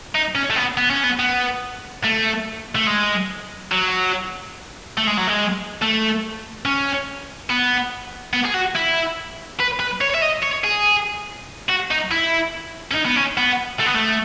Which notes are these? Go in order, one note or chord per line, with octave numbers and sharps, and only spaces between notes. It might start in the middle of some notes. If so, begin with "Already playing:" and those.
D#4
C#4
A3
B3
B3
C#4
B3
B3
A3
A3
G#3
F#3
A3
G#3
F#3
G#3
A3
C#4
B3
B3
G#4
F#4
E4
B4
B4
C#5
E5
D#5
C#5
G#4
F#4
D#4
E4
C#4
D#4
B3
C#4
B3
A3
B3
A3